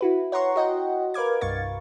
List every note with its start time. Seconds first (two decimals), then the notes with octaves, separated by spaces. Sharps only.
0.01 E4 F#4 B4
0.32 C#5 F#5 A#5 C6 C#6
0.56 F#4 D#5 F#5 G5
1.14 A#4 B4 F5 D6 G#6
1.41 C2 G2 F5 C#6 A6